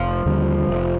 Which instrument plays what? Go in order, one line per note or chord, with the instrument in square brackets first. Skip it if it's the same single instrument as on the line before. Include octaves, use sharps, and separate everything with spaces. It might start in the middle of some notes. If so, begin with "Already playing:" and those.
Already playing: [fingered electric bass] F1 [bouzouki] F3
[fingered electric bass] D#2 D3 G3
F1